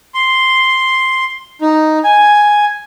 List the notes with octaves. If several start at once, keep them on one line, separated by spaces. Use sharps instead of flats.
C6
D#4
G#5